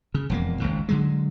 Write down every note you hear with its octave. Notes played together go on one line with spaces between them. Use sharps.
C#3
E1 F2 A#3
G#1 C#2 G#2
D3 F#3 G#3